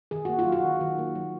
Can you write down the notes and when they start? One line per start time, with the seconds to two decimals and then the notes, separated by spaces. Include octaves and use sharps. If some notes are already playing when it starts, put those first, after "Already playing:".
0.11 D#3 G#4
0.25 A#3 F#4
0.39 F4
0.46 F#3
0.52 F#4
0.64 D#3
0.81 D#3
0.98 A#3
1.15 F#3